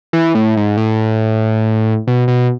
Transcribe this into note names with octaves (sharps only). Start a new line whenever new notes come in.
E3
A2
G#2
A2
B2
B2